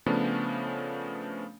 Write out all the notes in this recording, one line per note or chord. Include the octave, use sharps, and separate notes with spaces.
C#3 F3 A3 B3 C#4 D4